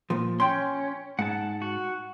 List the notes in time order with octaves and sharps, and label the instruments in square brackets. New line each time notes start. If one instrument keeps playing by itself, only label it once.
[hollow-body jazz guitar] A#2 F3
[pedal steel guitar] C#4 [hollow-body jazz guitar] G5 C6
[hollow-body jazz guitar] G#2 [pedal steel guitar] F#5 A5
[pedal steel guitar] F#4